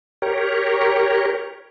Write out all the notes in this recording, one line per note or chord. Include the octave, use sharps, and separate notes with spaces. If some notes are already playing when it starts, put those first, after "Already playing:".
G4 A#4 C#5